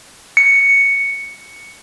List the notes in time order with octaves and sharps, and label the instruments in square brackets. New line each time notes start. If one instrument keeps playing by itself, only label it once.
[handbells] C#7